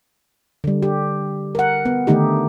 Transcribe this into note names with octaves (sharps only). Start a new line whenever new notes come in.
D3 G3
G4
A#4 F#5
B3
D3 D#3 A3 D#4 G4